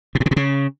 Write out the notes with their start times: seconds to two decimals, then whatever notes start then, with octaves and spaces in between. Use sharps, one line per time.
0.15 B2
0.20 A2
0.26 C#3
0.31 A#2
0.36 C#3